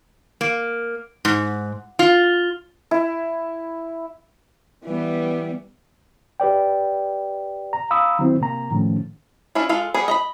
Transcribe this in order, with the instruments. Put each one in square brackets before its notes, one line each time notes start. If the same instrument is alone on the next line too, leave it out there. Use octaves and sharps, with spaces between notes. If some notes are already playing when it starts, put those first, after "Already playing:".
[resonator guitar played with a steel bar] A#3
G#2
F4
[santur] E4
[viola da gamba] E3 G3 B3
[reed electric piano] G4 B4 D5 G5
A#5
F5 A#5 B5 D#6 E6
D#3 F#3 C4 E4
C3 A#3 A#5
A2 D#3 F3 A3 C#4
[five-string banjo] C#4 D4 E4 F4
G#3 F4 A4 F5
G3 B3 G#4
D#5 A#5 B5